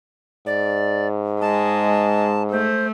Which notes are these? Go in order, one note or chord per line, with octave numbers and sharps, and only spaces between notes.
G#2 D5
G#3 A5
A3 C5